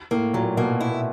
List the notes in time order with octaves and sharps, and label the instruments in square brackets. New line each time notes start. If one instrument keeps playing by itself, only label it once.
[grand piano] A2 [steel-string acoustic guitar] A#3
[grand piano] A#2 [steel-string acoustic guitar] F#3
[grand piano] B2 [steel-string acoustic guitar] A#3
[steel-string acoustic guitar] E4